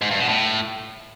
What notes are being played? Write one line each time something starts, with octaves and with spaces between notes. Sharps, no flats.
G#2
G2
B2
A2